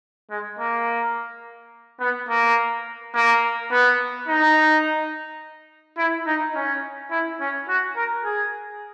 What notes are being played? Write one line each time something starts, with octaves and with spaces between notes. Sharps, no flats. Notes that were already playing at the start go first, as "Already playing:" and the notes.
G#3
A#3
B3
A#3
A#3
B3
D#4
E4
D#4
C#4
E4
C#4
F#4
A#4
G#4